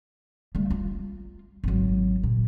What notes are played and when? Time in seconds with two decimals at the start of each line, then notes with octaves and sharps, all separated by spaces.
0.55 G3 A3
0.70 F4
1.64 G#1 F#3
2.23 A#2